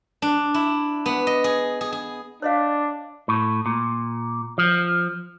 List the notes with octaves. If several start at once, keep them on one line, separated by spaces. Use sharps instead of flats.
D4
E4
B3
D#5
G#4
G#4
G#4
D4 C#5 D#5 F5
A2
A#2
F3